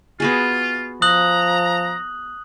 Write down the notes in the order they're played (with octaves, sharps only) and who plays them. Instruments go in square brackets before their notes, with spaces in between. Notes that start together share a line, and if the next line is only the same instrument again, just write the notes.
[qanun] B3 F#4 G#4 [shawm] F4
[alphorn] F3 [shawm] A#5 [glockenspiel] D#6 F#6 F#7